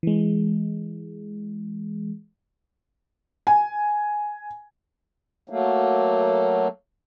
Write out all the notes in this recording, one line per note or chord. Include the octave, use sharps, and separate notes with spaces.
E3 G#3
G#5
F#3 A3 A#3